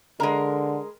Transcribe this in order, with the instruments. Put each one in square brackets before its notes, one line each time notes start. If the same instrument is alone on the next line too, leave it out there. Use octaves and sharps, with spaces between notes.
[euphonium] D3 [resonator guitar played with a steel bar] G#3 A#4